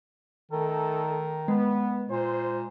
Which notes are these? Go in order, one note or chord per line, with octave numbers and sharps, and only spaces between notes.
D#3 A3 D#4 A4
G#3 B3
A#2 C5